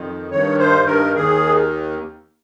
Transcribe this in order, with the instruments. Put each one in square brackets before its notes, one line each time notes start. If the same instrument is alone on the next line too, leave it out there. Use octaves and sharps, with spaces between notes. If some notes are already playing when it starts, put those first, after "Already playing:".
Already playing: [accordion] F2 D#3
G2 D#3 C#5
C5
A#4
D#2 D#3 G#4